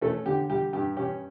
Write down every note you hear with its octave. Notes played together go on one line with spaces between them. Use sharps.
A3 C#4 A4
D3 G4
G3 G4
G2 G4
C#4 G4